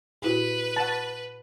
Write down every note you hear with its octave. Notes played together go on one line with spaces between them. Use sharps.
A#2 E4 F#4 B4
F#5 A5